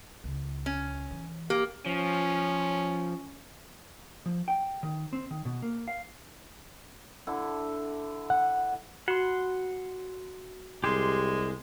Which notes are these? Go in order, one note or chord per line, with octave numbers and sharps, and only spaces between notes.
C#2
C#4
E3
A#3 G4
F3 C#4
F3
G5
D#3
C4
D#3
B2
A#3
F5
D3 E4
F#5
F#4 F#5 C6
C2 G#3 G4 C6